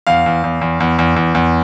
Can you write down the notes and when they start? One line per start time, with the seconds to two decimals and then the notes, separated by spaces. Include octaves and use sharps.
0.07 E2 F5
0.26 E2
0.44 E2
0.61 E2
0.80 E2
0.99 E2
1.16 E2
1.35 E2